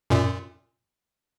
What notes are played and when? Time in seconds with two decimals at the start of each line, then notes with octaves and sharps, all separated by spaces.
0.10 F#2 A#2